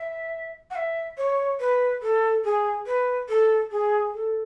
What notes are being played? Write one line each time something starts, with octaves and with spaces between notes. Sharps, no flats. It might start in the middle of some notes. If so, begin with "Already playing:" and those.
Already playing: E5
F#5
E5
C#5
B4
A4
G#4
B4
A4
G#4
A4